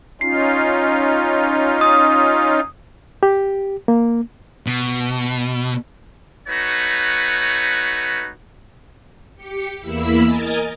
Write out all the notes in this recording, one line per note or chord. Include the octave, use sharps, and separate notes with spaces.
C#4 D#4 F4 C7
D#6
G4
A#3
B2
A3 D#4 F#4 B4 C#5
G4 C#7
E2 A#3 E4 B5 E6
A#4 D#5 G#5 A6